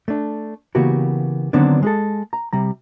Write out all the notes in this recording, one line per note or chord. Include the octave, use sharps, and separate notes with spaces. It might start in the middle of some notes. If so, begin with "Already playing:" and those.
A3 D4
C#3 E3 A#3 B3 F#4 G4
D3 D#3 F#3 B3 C4 D4
G#3 G#4 A4
A#5
C3 G3 A#5